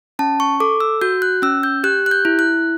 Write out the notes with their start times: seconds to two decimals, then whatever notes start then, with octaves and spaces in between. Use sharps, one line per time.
0.19 C#4 A5
0.40 C#6
0.60 A4 D6
0.80 E6
1.01 F#4 G6
1.22 F#6
1.42 C#4 E6
1.63 G6
1.84 G4 F#6
2.06 F#6
2.11 G6
2.25 E4
2.39 F#6